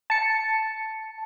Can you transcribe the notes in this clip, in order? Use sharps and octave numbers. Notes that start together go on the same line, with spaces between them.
A5 C#7